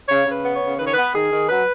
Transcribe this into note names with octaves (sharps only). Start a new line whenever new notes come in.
C#3 C#5
C#3
B4
B3
C#5
C#3
D#3 B4
C#5
B3 B4
D#3 G#4
D#3
F#3 B4